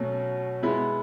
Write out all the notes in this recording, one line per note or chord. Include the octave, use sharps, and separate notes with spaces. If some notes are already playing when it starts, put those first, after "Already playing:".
Already playing: B2 F#3 A3 C#4 F#4
B2 G#3 B3 E4